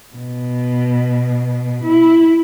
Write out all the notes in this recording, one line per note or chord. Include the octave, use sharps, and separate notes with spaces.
B2
E4